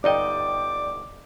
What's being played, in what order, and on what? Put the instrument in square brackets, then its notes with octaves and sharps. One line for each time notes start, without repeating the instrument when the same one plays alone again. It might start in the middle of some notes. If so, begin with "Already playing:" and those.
[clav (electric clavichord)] G1 D#4 D#5 [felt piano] D5 G5 [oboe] D6